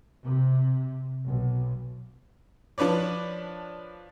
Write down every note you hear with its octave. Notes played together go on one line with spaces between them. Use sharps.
C3
B1
F3 D4 B4 C#5 D5